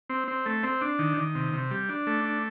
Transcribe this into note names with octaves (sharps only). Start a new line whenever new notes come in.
C4
C4
A3
C4
D4
D#3
D#3
C3
C3
G3
D4
A3
D4